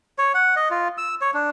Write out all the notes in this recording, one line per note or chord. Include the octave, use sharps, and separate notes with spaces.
C#5
F#5
D#5
F4
E6
C#5
D4